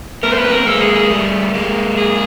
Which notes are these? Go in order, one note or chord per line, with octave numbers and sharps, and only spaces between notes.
A3 B3 A#4
C5
B3 B4
A#3 C4
A#4
G#3 A#3 A4
G#4
G#4
G3 A3
G#3 A#3
G#4